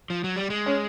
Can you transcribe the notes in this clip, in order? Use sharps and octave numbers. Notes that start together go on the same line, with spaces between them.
F3
F#3
G3
G#3
C#4